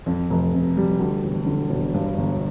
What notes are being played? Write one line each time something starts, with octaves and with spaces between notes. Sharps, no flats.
F2
F1
C3
G3
D2
E1
D3
E1
G2
G1